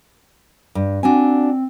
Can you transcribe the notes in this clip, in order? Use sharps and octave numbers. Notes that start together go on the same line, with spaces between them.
G2
C4 D4 F#4 G#5